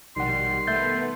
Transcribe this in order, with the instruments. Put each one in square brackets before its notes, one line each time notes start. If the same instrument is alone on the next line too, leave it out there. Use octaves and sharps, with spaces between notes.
[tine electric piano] A#1 B2 F#5 [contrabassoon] D#3 [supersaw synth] G3 [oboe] C6
[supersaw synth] A3 B3 [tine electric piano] E5 G6 A6